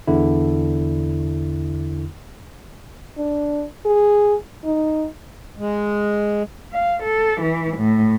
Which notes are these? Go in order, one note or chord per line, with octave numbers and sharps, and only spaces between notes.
E2 D3 E4
D4
G#4
D#4
G#3
F5
A4
E3
A2